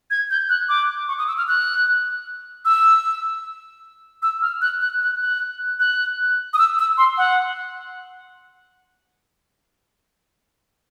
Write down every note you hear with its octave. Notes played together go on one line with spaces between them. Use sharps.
G#6
G6
F#6
D6
C#6
D#6
E6
F6
F#6
E6
E6
F6
F#6
F#6
F#6
F#6
F#6
D#6
E6
E6
C6
F#5